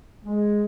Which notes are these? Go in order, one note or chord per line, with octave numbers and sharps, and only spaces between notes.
G#3